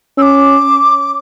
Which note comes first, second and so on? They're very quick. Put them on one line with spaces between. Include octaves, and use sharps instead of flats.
C#4 E6 D6